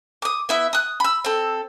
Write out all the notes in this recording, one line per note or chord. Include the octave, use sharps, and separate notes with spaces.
D6 D#6
B3 E4 E5
D#6 F#6
B5 E6
C4 A4